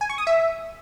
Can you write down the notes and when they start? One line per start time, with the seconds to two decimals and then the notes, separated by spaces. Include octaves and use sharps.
0.01 G#5
0.10 C#6
0.18 D#6
0.27 E5